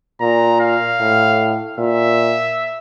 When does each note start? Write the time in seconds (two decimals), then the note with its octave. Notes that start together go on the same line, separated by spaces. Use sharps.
0.21 A#2 A#5
0.60 F5
1.00 A2
1.78 A#2 E5